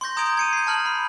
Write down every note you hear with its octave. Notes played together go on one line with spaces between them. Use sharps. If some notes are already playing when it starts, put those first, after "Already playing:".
C6 C#6 G6 A#6
A#5 D#6 G6 G#6 D7 F7
G#6 C#7 D#7
G6 C7
A5 F6 F#7
B5